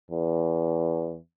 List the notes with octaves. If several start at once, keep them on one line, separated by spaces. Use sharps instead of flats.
E2